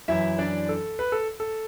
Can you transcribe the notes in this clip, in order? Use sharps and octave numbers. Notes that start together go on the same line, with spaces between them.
F#2 E3 E4 E5
D4 D5
A4
B4
A4
A4